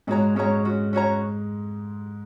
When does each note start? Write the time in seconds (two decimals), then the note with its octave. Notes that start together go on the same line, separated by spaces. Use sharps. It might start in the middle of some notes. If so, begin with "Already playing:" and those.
0.07 G#2 G#3 C#4 F#4 C#5 A#5
0.35 G#2 G#3 C#4 F#4 C#5 A#5
0.65 C#4 F#4
0.93 C#4 F#4 C#5 A#5